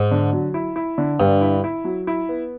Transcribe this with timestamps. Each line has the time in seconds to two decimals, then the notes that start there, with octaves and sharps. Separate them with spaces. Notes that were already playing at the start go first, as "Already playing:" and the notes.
Already playing: G#2
0.11 D3
0.33 F#3
0.54 E4
0.76 E4
0.98 D3
1.20 G2 D3
1.41 E4
1.64 E4
1.84 F#3
2.07 E4
2.29 B3